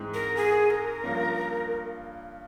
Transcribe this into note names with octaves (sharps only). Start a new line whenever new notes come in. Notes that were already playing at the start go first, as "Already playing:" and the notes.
Already playing: G#2 E3 G#3 C4
A#4
G#4
A#4
G2 F3 A#3 C#4